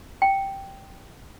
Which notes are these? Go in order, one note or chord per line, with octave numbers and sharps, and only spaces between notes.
G5